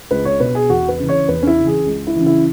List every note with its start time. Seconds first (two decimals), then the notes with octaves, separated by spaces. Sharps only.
0.11 C#2 B4
0.25 C#5
0.40 B2 B4
0.55 G#4
0.70 E2 F#4
0.89 B4
0.99 C#3 E3
1.09 C#5
1.28 E2 B4
1.43 C#4
1.47 E4
1.57 C#3 E3
1.67 G#4
1.86 C#2
2.07 E4
2.16 C#3 E3
2.26 E4